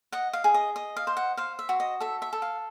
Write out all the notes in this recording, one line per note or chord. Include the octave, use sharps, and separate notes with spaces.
D#5 F#5
F5
G#4
D#5
D#5
F5
C5
F#5
C5 F5
E5
F#4
D#5
A4 E5
E5
A4
F5